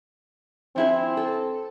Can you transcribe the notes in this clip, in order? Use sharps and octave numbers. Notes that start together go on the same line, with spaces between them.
F3 C4 E4 G#4
A4